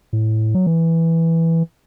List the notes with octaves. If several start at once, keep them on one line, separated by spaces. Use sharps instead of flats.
A2
F#3
E3